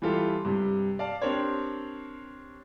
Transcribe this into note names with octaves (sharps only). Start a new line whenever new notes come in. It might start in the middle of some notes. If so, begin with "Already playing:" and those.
E3 G3 E4 F4 G4 A4
G2 C3
D5 F5 A5
C4 D4 G4 A#4 C5 C#5